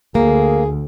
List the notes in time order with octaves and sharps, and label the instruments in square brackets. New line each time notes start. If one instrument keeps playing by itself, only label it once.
[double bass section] D2 [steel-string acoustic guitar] A#3 [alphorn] G#4